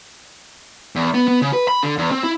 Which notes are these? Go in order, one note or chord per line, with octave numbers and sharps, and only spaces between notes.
E2
B3
B3
C#3
B4
B5
D3
E2
C4
E4